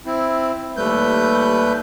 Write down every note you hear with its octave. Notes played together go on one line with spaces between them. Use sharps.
C4 E4
D#2 G3 A3 B4 G6